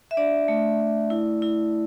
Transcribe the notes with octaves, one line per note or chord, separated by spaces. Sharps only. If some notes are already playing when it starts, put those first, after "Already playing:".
E5
D4 D5
A3
A3
E4
E4